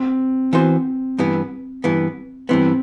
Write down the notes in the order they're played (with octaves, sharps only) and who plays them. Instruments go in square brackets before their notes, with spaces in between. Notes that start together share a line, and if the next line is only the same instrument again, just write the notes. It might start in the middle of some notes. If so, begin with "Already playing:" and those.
Already playing: [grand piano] C4
[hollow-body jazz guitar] E3 B3 F#4 C5
G2 E3 B3
G2 E3 B3
[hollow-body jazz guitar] G2 E3 B3 [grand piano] C4